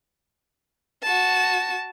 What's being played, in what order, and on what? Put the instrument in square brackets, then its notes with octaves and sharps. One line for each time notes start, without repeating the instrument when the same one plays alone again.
[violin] F#4 A5